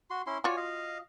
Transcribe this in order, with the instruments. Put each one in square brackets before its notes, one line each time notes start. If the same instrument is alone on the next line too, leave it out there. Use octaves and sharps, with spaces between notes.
[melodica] F#4 C6
C#4 E4 C6
[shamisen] F4 F#4 [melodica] C#5 D5 G#5
[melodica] D#5 F5